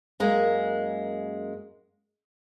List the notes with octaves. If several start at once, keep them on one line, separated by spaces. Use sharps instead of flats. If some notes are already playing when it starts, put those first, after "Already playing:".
F#2 G#3 A#3